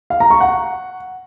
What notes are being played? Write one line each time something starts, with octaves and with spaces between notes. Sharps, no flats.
F5
A#5
C#6
F#5